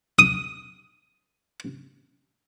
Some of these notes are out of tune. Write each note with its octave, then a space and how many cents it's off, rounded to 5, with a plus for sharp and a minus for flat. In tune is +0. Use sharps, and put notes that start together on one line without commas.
D#6 +5